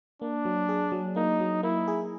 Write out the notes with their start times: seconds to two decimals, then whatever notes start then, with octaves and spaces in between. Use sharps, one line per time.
0.22 A#3 D4
0.45 F#3
0.69 G#4
0.92 F#3
1.16 A#3 D#4
1.40 F#3
1.63 A#3 E4
1.88 G#4